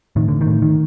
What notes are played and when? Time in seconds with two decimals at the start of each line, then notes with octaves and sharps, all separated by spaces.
0.16 A2 D#3
0.28 D3
0.41 D#3
0.46 A2
0.62 D#3